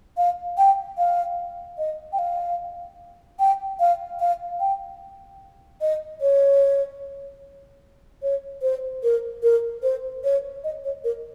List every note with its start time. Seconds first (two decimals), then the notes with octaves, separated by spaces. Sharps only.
0.17 F5
0.58 G5
0.98 F5
1.78 D#5
2.13 G5
2.19 F5
3.39 G5
3.80 F5
4.20 F5
4.60 G5
5.81 D#5
6.21 C#5
8.22 C#5
8.62 C5
9.03 A#4
9.43 A#4
9.83 C5
10.24 C#5
10.64 D#5
10.84 C#5
11.04 A#4